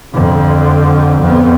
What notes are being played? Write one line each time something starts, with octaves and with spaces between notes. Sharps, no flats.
F2 D3
F2 B3